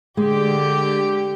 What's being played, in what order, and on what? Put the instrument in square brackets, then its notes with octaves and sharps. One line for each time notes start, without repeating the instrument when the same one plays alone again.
[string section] D3 G4 [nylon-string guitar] G#3